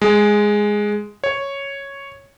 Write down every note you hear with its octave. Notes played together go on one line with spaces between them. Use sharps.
G#3
C#5